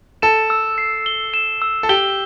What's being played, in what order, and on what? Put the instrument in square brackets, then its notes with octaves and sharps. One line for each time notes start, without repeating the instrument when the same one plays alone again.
[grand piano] A4 [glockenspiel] E7
[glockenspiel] E6
C7
G7
E7
E6
[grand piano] A4
[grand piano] G4 [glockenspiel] G7